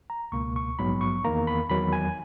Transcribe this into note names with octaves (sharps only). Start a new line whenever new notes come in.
A#5
C#2 B2 A#3 C#6
C#6
A#1 G#2 F#3 B3 B5
C#6
E2 D#3 A#3 A#5
B5
E2 D#3 F#3 B5
G#5